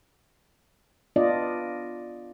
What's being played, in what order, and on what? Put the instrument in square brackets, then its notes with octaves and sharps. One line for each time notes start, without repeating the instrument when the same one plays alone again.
[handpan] B3 D4 F4 D5 D#5